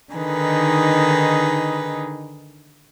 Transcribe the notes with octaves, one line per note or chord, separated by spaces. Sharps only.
D3 D#3 D#4 G#4 B4